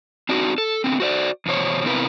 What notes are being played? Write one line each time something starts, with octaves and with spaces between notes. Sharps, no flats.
C4 D4 D#4 F#4
A4
D3 B3 C4
F#4 C5 D5
E2 B2 C5 C#5
C3 B3 C4 E4 A#4 B4